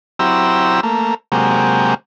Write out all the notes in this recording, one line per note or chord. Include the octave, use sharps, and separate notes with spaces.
F#3 C4 E4 G4 A#5 E6
A3 A#3
C3 F#3 G#3 A#3 G4